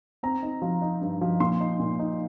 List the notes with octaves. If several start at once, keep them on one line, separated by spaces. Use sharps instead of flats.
C4 A#5
D#4
F3
D#4
G2
F3
A#2 C6
D#4
A#2
D#4